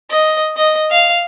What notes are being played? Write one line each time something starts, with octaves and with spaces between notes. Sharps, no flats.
D#5
D#5
F5